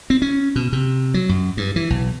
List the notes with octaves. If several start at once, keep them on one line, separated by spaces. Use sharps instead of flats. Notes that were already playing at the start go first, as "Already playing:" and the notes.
C4
C#4
B2
C3
F#3
F#2
G2
E3
B1